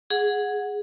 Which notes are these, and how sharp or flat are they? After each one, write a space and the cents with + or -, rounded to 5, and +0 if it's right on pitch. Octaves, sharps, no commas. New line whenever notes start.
G#4 +0 F#5 -15